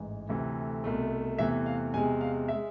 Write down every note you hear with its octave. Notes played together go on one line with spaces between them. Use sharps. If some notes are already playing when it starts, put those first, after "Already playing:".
Already playing: A1 G#2 E3
D2 C3 E3 A3
C2 B2 A3
E2 C3 E3 A3 E5
F5
E2 C3 G#3 G#5
F5
G#3 E5